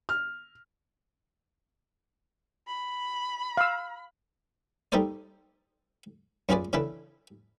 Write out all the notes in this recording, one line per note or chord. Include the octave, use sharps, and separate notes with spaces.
F6
B5
F5 E6
G3 D#4 A4 A#4 C5 D5
F#2 C#4 F4 G#4 B4 D5
C#3 E3 D4 A4 B4